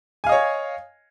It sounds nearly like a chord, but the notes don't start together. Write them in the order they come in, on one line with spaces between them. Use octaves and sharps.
G#5 F5 D#5 C#5